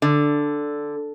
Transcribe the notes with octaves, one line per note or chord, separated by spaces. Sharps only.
D3